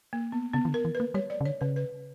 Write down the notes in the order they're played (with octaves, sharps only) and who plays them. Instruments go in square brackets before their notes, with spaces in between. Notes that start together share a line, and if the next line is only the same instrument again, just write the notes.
[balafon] A#3
B3
[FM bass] C#3 [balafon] B3
[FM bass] E3
D3
[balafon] A#4
[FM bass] E3
[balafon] B4
[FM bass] A#3
[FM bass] G3 [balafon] C#5
[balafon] D5
[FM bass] C#3
[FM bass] D3 [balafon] C#5
[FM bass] C#3 [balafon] B4
[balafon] B4